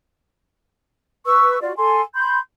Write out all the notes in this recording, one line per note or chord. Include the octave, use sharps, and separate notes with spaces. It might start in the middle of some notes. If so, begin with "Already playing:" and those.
B4 C#6 E6
F4 F#4 D5
A4 G#5 C6
B5 C6 G6